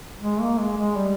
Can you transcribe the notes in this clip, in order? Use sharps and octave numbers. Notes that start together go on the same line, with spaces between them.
G#3
A#3
G#3
G#3
G3